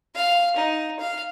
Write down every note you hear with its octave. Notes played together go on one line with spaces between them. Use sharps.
F5
D#4
F5